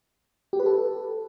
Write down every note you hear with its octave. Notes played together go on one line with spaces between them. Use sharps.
G4
B4
A4